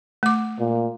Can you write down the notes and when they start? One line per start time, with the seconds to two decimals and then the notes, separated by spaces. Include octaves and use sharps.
0.23 A3 D6
0.60 A#2